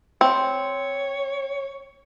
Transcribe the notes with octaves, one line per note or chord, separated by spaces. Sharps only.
C4 C#5